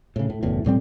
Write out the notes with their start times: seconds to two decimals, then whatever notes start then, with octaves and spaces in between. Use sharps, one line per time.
0.16 A2 C#3
0.30 A2
0.43 F#1 E2 A2
0.65 E1 A2 G3 C4